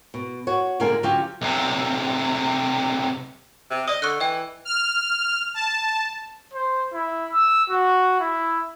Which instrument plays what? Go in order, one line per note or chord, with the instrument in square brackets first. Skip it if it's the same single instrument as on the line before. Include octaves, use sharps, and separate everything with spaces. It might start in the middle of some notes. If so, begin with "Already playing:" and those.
[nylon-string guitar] B2
F#4 C#5
A#2 D3 G#3 A#3 A#4 G#5
D3 F#3 C#4 F4 G4
[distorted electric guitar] B1 C3
[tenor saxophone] C3
[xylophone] D5 D#6 [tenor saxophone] D#5
[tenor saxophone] D3 [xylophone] C#6 F6 F#6
[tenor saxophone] E3 [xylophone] D#5 G5
[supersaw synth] F6
A5
[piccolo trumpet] C5
E4
E6
F#4
E4